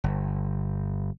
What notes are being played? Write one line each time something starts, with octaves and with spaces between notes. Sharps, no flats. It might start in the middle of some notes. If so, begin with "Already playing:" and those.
G1